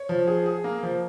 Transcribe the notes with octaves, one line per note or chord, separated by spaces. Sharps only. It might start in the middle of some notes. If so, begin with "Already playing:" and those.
Already playing: C#5
F3
G#4
G#4
A#3
F3